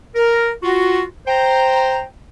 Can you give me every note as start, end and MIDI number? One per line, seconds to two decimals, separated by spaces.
0.16 0.51 70
0.63 1.03 65
0.63 1.03 66
1.27 2.02 72
1.27 2.02 79
1.27 2.02 82